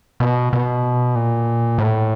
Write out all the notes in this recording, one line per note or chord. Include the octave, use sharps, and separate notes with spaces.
B2
B2
A#2
A2